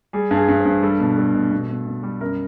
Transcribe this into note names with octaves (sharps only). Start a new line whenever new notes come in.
G3 G#4
G2
G#4
G2
C5
G2
G3 A4
B2
G3 A4
B2
B2
B2
B2
G3
F#2 A#4